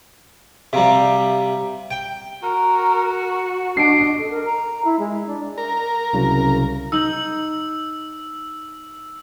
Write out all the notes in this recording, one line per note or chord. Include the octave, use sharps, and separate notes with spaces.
C3 G3 E5 F5 A#5
G5
F#4 A#4
D4 D#5 C7 D7
A4
A#4
A#5
E4
G#3
D4
A#4
C2 C#3 F#3
D#4 E6 G6 F#7